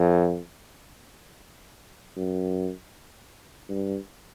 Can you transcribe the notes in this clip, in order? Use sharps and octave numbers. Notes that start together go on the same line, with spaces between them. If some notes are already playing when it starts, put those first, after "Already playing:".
Already playing: F2
F#2
G2